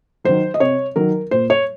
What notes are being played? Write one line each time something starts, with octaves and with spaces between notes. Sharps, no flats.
D#3 F#3 C5
D#5
C3 C#5
D#3 F#3 A#4
A#2 C5
C#5